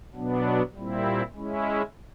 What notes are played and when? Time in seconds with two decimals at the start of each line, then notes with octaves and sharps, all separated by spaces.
0.13 B2 F#3 B3 D4
0.74 A#2 G3 C4 E4
1.34 G#3 C#4 E4